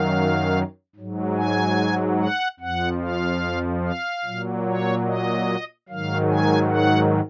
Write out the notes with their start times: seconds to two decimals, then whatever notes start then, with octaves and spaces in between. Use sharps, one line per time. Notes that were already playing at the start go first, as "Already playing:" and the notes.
Already playing: F#2 D#3 F#3 F5
0.96 G#2 F#3
1.37 G#5
2.19 F#5
2.60 F2 F3 F#5
3.01 F5
3.84 F5
4.25 A#2 F#3
4.66 C#5
5.07 D#5
5.89 G#2 D#3 F#3 F5
6.30 G#5
6.71 F#5